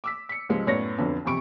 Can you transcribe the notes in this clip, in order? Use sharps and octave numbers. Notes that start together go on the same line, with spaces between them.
D6 E6 B6
B6 C#7
C#2 F3 G3 G#3
F#2 A2 B3 C#5 D5 A#6
B1 F2 D3 B3
E1 F2 C3 B5 C#6 D7